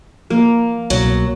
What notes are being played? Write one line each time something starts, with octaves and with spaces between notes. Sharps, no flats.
F3 A#3
C2 B2 F#3